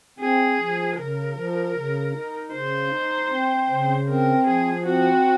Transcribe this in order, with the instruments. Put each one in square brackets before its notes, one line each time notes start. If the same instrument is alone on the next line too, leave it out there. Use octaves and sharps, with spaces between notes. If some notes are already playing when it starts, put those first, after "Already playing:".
[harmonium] C4 [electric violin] G#4
[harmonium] F3
[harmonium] C#3 [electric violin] A#4
[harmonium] F3
C#3
D#4
[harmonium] C#3 [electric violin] C5
[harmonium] D#4
C4
C#3
[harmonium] C4 [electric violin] A#4
[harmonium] F3 [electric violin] G#4
[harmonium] C4 [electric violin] F#4